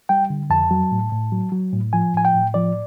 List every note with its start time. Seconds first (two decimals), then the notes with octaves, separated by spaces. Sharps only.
0.09 G3 G5
0.30 D3
0.50 F2 A5
0.71 F#3
0.92 A2
1.12 A2
1.32 F#3
1.52 F#3
1.73 A2
1.93 F3 G#5
2.14 A2 G#5
2.25 G5
2.34 A2
2.54 F3 D5